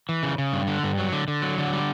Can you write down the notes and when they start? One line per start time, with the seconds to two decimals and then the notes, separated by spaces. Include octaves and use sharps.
0.09 E3
0.23 C#3
0.38 C#3
0.53 G2
0.67 D3
0.83 G2
0.98 F#3
1.13 D3
1.28 D3
1.42 F#3
1.58 D3
1.73 G3